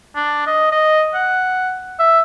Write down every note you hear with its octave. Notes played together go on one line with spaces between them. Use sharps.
D4
D#5
D#5
F#5
E5